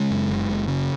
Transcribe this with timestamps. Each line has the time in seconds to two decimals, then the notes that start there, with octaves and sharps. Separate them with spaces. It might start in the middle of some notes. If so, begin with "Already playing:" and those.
Already playing: C#3 G#3
0.11 F#2
0.29 F#1
0.49 F#1
0.68 C#3